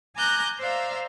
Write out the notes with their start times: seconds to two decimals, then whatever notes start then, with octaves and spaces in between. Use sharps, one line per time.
0.16 G#5 A#5 D6 F#6 G6 A#6
0.60 C5 D5 E5 F5 A#5